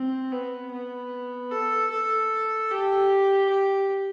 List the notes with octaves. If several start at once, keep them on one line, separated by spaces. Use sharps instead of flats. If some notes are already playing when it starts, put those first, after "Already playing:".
Already playing: C4
B3
B3
A4
A4
G4
G4